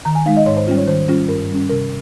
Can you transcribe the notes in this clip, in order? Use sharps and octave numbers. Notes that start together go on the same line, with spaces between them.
D#3 A#5
G#5
G#3 D#4 F5
D#5
G#2 C#5
C5
G3 C#4 F4
C#5
D#3 C5
G3 C#4 F4
G2 A#4
G3 C#4
C3 A#4